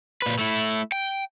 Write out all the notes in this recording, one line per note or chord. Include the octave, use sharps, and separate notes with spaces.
A#2 B4
A3 E4
G5